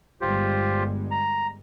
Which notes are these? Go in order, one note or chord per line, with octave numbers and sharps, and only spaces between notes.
G1 G3 G#3 F4 G4 C5
A#5